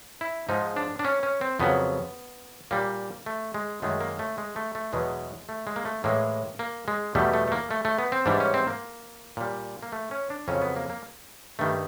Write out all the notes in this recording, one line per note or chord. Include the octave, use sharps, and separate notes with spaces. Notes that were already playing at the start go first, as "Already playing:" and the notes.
E4
G#2 F3 G#3 D#4
D4
D4
C#4
C#4
C4
F2 C#3 F#3 B3
A#2 G3 A#3
A3
G#3
F#2 D#3 G#3 A3
A#3
A3
G#3
A3
A3
E2 B2 F#3 G#3
A3
G#3
A#3
A3
A2 E3 G#3 A#3
A#3
G#3
E2 B2 G3 A3
A3
A3
A#3
A3
A3
B3
C4
G#2 E3 G3 D4
C#4
C4
A#3
A#2 G3
A#3
A3
C#4
D4
F2 C#3 F#3 C#4
B3
A#3
A#3
G2 D#3 G3 A3